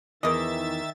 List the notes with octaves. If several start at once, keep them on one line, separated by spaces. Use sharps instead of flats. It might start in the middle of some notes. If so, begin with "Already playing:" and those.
E2 D#3 E3 A#4 D#5 E5 A6